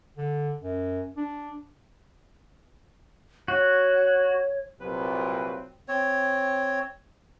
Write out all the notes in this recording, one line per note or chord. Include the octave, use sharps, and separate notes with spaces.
D3
F#2
D4
F#4 C#5
C2 A#2 F#3 C4 B4
C4 C#5